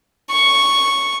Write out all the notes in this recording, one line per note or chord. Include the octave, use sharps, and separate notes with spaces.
C#6